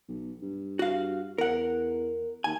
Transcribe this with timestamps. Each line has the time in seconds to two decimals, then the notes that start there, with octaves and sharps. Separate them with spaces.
0.08 B1
0.42 G2
0.79 F#4 F5
1.38 E2 A#4 F#5
2.44 D#2 G#5